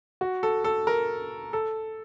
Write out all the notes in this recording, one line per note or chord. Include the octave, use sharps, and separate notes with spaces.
F#4
A4
A4
A#4
A4